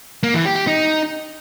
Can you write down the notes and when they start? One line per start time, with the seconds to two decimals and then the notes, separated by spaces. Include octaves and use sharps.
0.23 A#3
0.34 E3
0.45 G4
0.56 G4
0.67 D#4